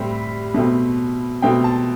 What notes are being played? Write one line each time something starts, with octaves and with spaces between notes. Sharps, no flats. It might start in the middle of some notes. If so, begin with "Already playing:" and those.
Already playing: A2 G3 C4
B2 A3 C4
B2 A3 C4 G5
A5